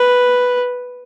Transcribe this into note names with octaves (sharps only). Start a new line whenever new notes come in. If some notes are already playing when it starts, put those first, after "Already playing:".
Already playing: B4